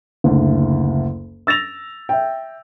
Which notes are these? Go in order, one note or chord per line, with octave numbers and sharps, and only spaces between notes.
F#1 D2
E6 A6 A#6 F7
E5 G5